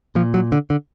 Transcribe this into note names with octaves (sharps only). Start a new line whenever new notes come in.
A#2 F3
F#3
D3
D3